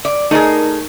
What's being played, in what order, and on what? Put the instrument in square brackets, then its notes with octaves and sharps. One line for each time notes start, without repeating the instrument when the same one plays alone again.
[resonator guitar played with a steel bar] D5
[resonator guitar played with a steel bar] A3 G#4 [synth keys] D#4 A#4